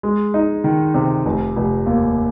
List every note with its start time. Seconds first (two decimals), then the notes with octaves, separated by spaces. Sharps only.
0.03 G#3
0.34 D#4
0.64 D#3
0.94 C3
1.25 F1
1.56 F1
1.86 D#2